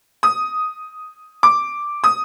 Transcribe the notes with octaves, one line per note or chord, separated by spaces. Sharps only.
D#6
D6
D#6